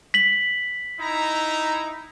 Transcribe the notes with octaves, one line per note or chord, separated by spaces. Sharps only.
B6 F#7
D#4 E4 A#5